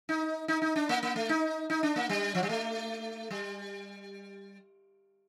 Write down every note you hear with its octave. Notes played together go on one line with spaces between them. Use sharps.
D#4
D#4
D#4
D4
A#3
A#3
A3
D#4
D#4
D4
A#3
G3
F3
G3
A3
G3